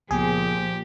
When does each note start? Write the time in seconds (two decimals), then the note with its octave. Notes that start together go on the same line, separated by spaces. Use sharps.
0.11 C#2 A#2 F3 B3 G4 G#4